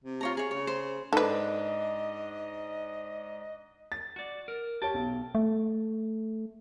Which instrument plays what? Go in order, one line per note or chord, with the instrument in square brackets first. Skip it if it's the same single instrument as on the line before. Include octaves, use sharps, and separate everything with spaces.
[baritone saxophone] C3
[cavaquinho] F4 C#5 A#5
G#4 C#5
[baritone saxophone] C#3 [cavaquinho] C#5
[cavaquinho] C5
[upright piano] G#2 D4 [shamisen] A4 B4 [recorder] D#5
[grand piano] A6
[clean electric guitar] F#4 D5
A#4
[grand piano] G4 C#5 [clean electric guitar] G5 A5
[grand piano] B1
[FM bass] A3